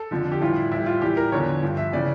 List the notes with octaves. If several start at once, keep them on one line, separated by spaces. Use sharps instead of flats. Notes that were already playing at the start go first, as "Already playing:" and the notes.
Already playing: A4
F2 D3 F3
G4
A2 E3 G3 F4
E4
A2 E3 G3 E4
F4
A2 E3 G3 G4
A#4
E2 D3 F3 C#5
G2 F3
E5
C#3 E3 D5